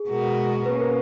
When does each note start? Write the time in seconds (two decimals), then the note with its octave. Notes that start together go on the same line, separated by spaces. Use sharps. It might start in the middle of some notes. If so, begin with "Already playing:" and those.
Already playing: G#4
0.09 B2 G#3 B3 F#4 A#4
0.66 B2 A#3 C#4 B4
0.80 A#4